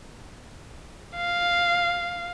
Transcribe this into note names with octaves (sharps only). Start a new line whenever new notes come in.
F5